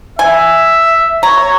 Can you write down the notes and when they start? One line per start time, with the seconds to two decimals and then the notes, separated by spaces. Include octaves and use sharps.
0.19 E5 G#5
1.23 C#5 A#5